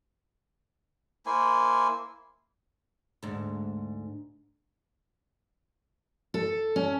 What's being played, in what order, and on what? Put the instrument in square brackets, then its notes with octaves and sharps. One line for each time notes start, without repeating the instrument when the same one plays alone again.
[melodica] A#3 E4 C5 G#5
[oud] D2 G#2
[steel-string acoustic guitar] A4
C#4